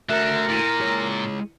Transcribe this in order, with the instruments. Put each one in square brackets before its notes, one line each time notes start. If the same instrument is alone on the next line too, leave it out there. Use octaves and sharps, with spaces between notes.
[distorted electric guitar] D3 [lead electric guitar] A3 F#4 [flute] A#4 [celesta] E5 F#6 E7
[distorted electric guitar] A#2 [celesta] E4 D#7
[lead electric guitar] G#3 C#5